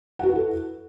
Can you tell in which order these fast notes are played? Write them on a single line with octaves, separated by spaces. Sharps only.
F#5 F#4 B4 E4 A4